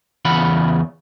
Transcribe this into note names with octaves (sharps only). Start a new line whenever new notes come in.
E2 C#3 E3 F4 F#5 B5